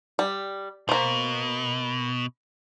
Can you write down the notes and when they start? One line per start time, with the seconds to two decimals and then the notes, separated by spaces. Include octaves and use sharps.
0.19 G3
0.89 B2 A#3 C5